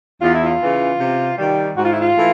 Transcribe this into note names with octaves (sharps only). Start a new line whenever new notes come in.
E2 F4
E4
F4
C#3 E3
C3
D#3 G3
G#2 F#4
F4
E4
F4
E3 A3